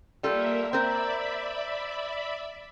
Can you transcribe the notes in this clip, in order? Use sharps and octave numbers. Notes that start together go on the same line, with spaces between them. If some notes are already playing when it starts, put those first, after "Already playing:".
G3 A#3 F4 A4 A#4 E5
C4 A#4 D5 E5 B5